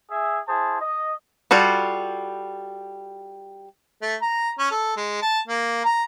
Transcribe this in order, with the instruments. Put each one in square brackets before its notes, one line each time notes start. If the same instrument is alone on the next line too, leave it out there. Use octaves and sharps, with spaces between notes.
[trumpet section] G#4 E5
E4 G#4 C5 A5
D#5
[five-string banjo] G3 F4 F#4 A4
[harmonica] A3
A#5
C#4
A4
G#3
A5
A#3
A#5